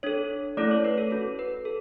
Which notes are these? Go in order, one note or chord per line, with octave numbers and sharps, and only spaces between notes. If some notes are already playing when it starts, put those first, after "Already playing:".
D4 A4 C#5
A3 C#4 E4 A4 D5
C#5
B4
A4
C#4 F#4 A4
B4
A4